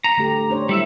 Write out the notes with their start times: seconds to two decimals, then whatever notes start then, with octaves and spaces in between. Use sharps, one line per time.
0.04 A#5
0.17 D3 A3 G4
0.50 D4 C5 C#5
0.69 G3 E4 E5